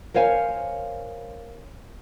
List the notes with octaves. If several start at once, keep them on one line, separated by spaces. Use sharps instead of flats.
A#4 C5 C#5 F5 G#5